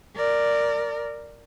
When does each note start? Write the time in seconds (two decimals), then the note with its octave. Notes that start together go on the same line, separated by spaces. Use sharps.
0.16 A#4 D5